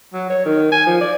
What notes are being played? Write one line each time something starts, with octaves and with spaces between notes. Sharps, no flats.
F#3
C#5
D#3
G#5
F3
D5